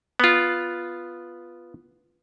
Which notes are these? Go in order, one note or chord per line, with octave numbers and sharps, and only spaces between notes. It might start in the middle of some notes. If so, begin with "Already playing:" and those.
B3 F4